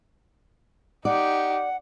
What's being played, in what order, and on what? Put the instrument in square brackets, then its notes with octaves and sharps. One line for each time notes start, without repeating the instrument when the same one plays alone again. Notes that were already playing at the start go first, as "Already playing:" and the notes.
[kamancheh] D#4 G4 [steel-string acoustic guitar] D5 [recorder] F#5